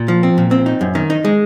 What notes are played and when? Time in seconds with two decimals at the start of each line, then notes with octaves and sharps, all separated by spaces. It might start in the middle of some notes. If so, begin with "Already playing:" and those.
Already playing: A#2
0.08 F3
0.23 C4
0.38 A#2
0.51 C4
0.66 D#4
0.81 F#2
0.95 D#3
1.10 D#4
1.25 G#3